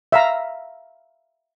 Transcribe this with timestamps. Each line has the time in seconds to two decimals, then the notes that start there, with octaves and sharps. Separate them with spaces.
0.12 E5 F5 A#5